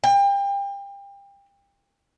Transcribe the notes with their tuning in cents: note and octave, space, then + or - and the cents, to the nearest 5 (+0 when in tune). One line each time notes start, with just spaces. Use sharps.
G5 +30